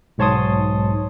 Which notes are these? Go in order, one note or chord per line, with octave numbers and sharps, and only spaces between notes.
B1 G#2 C#5 A5 C6 D#6